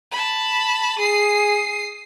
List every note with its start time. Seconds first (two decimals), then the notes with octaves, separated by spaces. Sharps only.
0.11 A5 B5
0.99 G#4 D#6 C7